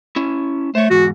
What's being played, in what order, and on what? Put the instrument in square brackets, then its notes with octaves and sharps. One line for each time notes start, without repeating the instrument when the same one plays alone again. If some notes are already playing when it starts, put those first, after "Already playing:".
[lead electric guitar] C#4 E4
[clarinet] A3 [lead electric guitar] C5 C#5
[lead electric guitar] E2 G#2 [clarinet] F#4